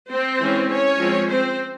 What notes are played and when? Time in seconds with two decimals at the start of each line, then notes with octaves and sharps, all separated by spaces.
0.09 C4 C5
0.39 E3 G#3 C#4
0.68 C#4 C#5
0.98 F3 G#3 C4
1.27 C4 C5